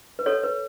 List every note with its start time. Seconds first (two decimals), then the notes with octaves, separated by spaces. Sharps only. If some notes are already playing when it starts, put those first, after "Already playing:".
0.19 B4
0.26 A4 C#5
0.43 B4